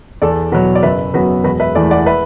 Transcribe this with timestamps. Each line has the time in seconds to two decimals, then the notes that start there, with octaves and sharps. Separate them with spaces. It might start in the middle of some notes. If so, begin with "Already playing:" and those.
0.22 E2 A4 D5
0.52 B2 F#3 F#4 B4
0.75 D5
0.83 F#1 B4 E5
1.14 F#2 F#3 B3 F#4 B4
1.44 E1 F#4 B4
1.60 B4 E5
1.75 E2 E3 A3 A4 D5
1.91 D5 F#5
2.06 B4 E5